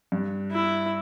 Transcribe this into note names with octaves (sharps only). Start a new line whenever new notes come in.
G2
E4